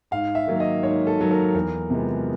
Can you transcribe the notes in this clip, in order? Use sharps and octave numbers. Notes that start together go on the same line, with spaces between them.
G#2 F5
E5
D#3 F#3 A#3
D#5
G#2 C#5
A4
D#3 F#3 A#3
A#4
E2 A#4
C3 F3 G#3 B3